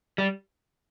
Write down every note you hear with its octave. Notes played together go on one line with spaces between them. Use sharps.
G3